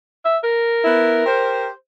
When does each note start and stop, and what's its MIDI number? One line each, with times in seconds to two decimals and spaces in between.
0.25 0.37 76
0.44 1.67 70
0.84 1.23 59
0.84 1.23 64
1.26 1.70 67
1.26 1.70 72